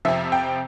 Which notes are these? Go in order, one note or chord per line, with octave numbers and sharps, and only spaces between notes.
F2 C3 F3 E5
G5